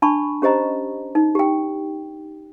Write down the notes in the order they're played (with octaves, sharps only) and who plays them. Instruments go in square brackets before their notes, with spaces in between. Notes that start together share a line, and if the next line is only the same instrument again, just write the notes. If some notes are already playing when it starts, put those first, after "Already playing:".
[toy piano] D4 A5 B5 C#6
C#4 G4 C5 D#5 A#5
D#4
G4 G5